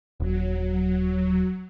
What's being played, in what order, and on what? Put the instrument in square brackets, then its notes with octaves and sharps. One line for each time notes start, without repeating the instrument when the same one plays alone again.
[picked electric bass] D#1 [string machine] F#3